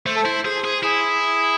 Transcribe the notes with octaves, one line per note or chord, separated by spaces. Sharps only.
A3 C5
A4
E4 C5
G#4 C5
G#4
E4 G#4